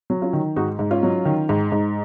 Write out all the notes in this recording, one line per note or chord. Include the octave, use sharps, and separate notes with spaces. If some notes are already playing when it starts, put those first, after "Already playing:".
F#3
C#4 F4
D#3
G#2 D#4 F#4
G#2
C#4 F4
F#3
D#3
G#2
G#2